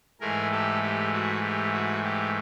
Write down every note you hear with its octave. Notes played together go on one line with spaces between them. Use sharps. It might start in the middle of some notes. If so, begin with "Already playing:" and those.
G#2 E3 A3 G#4 A#4
G4 A4
G4
F#4
G4
F#4
G4